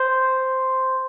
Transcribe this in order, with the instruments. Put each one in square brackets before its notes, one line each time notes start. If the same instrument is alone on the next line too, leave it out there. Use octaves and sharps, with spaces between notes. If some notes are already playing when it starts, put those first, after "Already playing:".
Already playing: [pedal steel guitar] C5